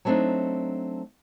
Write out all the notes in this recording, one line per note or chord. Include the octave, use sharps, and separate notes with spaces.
F#3 G3 A3 C4 D4 D#4